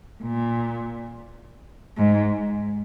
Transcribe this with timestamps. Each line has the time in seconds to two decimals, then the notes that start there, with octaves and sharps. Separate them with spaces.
0.23 A#2
1.98 G#2